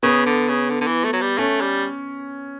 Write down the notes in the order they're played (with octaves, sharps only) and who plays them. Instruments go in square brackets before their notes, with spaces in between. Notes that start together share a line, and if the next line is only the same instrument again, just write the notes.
[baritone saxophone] C#3 [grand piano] B3
[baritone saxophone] D3
C#3
D3
D3
E3
A3
F#3
G3
[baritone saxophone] A3 [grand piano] C#4
[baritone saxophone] G3